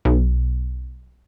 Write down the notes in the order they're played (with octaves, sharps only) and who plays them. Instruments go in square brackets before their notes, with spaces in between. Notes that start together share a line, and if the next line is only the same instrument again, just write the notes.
[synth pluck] B1